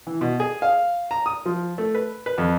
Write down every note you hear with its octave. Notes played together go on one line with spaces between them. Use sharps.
E3
B2
G#4
F5
A#5
D#6
F3
A3
B4
B4
F2